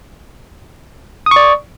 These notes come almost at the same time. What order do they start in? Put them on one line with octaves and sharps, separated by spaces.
D#6 C#6 D5